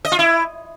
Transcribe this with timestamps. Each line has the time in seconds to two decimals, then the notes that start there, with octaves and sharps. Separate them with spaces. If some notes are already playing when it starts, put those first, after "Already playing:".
0.05 D#5
0.12 F4
0.19 E4